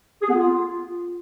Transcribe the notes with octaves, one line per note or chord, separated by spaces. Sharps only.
G#4
B3
F4